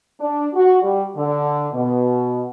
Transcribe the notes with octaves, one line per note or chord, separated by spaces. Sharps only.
D4
F#4
G3
D3
B2